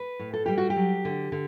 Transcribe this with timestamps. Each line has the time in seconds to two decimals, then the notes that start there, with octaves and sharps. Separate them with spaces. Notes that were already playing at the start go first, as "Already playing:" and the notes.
Already playing: B4
0.19 A2
0.34 A4
0.46 G3 G4
0.58 F#4
0.70 G4
0.76 F#3
1.05 D3
1.32 D3